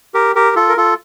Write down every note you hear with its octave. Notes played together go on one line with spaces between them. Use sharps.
G4 A#4
G4 A#4
F4 A4
A#4
F4 A4